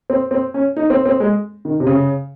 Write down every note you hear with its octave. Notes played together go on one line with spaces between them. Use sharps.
C4
C4
C#4
D#4
C4
C4
G#3
D#3
C3
C#3